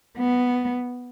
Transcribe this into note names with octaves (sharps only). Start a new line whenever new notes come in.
B3